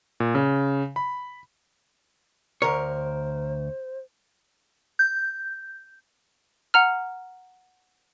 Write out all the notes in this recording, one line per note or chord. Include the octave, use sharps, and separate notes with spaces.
A#2
C#3
B5
D2 A#4 C5 C#5
G6
F#5 A#5 F6